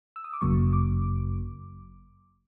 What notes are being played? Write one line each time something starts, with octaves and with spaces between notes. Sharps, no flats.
E6
D#6
D6
G1 F#2 C#3 F#3 A#3 C#6
D6